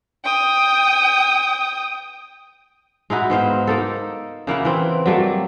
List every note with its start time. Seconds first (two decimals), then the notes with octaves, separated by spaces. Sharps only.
0.25 G5 D#6
3.10 G#3 D#4 E4 F#4
3.30 G#2 B3 C5 F5
3.67 A#3 D#4 A4
4.47 C#3 A#3 E4 F#5
4.65 E3 C4
5.06 F#3 G3 A3 A#3